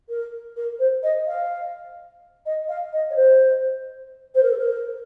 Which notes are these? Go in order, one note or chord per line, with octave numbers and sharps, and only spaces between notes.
A#4
A#4
C5
D#5
F5
D#5
F5
D#5
C#5
C5
C5
A#4
A4
A#4